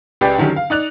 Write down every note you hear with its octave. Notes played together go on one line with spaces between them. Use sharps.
C#2 G4 B4 D5 G5 C7
D3 D#3 F#3 C#4 G4
F5
D#4 D5 F#6 F7